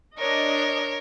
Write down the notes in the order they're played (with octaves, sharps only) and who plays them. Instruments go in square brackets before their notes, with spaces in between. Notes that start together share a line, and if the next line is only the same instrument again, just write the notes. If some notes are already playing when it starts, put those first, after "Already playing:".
[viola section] D4 D#5 [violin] A#4 C#5